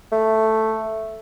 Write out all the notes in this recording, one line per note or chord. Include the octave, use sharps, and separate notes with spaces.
A3